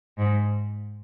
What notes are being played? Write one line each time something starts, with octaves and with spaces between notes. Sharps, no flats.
G#2